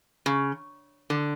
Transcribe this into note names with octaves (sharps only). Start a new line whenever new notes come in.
C#3
D3